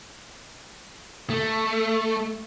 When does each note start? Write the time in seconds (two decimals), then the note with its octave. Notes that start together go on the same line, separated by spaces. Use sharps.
1.30 A3